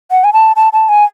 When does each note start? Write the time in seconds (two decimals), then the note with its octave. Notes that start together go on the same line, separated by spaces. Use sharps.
0.11 F#5
0.24 G#5
0.33 A5
0.56 A5
0.73 A5
0.89 G#5